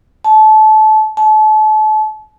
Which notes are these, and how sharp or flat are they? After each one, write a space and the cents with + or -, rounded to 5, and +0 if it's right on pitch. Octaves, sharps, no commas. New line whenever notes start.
A5 -25
A5 -35